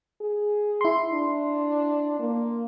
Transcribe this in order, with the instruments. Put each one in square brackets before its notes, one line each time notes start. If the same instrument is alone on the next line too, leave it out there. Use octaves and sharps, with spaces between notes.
[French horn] G#4
[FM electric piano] E4 C6
[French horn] D4
A#3